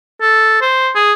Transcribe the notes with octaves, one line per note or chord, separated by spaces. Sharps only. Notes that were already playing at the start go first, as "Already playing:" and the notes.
A4
C5
G#4